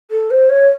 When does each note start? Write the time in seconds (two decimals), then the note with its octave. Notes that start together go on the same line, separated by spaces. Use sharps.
0.11 A4
0.31 C5
0.49 C#5